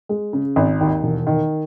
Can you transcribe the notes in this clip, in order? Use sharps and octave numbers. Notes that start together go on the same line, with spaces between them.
G#3
C#3
G#1
D#2
E1
D#3